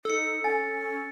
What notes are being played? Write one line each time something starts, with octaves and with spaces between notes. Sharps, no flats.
D#4 A4 E6 C#7
C#4 G#5 A6